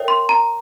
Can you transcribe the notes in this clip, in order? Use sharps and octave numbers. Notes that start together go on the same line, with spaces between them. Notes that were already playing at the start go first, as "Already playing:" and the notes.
Already playing: A#4 C#5 E5 G5
C6
A#5